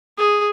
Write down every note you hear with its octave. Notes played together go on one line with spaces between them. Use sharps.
G#4